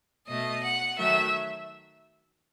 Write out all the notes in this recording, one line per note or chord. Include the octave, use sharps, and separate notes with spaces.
B2 A3 D#5
F#5
D#3 F#3 A3 E5